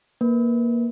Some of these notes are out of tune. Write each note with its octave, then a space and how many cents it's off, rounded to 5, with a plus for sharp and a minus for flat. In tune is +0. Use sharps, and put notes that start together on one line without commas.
A#3 +10 B4 +0